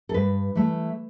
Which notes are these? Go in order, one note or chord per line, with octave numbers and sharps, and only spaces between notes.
A4
G2 B4
E3 A3